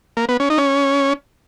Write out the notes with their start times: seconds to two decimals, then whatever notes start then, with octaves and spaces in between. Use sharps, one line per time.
0.17 A#3
0.29 B3
0.40 C#4
0.50 D#4
0.58 C#4